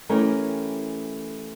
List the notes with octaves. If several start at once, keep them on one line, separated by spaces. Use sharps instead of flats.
E3 A3 C#4 G4 A#4